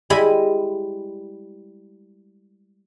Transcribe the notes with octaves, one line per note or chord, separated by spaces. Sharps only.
G3 G#3 E4 D#5 G#5 B5